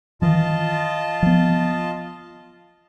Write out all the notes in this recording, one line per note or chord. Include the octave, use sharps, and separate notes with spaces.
D#3 E3 F4 D#5 A5
F3 B3